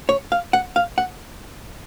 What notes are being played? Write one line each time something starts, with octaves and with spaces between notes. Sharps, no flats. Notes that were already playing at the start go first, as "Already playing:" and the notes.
C#5
F5
F#5
F5
F#5